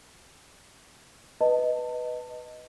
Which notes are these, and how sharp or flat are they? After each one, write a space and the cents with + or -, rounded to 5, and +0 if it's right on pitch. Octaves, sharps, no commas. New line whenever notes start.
B4 +0 D#5 +0 A5 +25